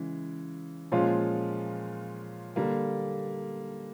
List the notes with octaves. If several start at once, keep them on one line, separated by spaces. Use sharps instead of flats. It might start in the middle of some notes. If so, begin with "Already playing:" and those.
Already playing: C#3 E3 G#3
A#2 F3 G#3 C#4 F4
D3 G3 A#3